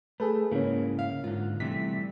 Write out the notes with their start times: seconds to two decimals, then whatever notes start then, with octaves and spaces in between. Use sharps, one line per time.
0.20 A3 G#4 A4 B4
0.51 G#2 C#3 A#3 C#4 E4
0.99 F5
1.24 G#2 D3 F4
1.60 C3 E3 G3 A3 B6